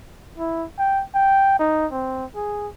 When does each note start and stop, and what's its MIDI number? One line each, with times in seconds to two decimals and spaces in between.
0.38 0.66 64
0.79 1.03 79
1.15 1.58 79
1.59 1.86 63
1.92 2.26 60
2.35 2.68 68